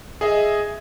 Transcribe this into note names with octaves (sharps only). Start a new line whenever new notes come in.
G#4 D#5 E5